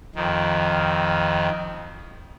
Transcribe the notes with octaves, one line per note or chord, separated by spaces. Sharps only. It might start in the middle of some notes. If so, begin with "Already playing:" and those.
F2 D#3